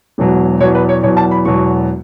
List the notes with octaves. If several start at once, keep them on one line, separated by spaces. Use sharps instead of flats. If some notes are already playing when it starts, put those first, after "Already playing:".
E1 E2 B2 F#3
E2 B2 F#3 C#5
B4
C#5
E2 B2 F#3 C#5
A5
B5
E1 E2 B2 F#3 C#6